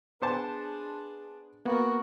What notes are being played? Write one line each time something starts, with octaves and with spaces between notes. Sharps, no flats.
B3 D4 G#4 C5 A5
A#3 B3 F#4 A#4